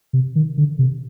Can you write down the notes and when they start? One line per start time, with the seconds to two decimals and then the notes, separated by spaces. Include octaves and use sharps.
0.13 C3
0.35 D#3
0.58 D3
0.79 C3